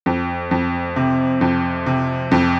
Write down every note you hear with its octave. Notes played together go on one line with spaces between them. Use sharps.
F2
F2
C3
F2
C3
F2